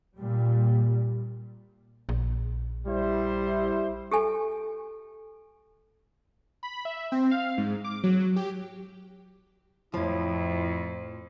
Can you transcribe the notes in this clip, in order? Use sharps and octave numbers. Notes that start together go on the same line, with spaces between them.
A#2 G3
A#1
G3 E4 C5
G4 A4 G#5
B5
E5
C4
F5
G#2
D6
F#3
G4
F2 A2 F3 E4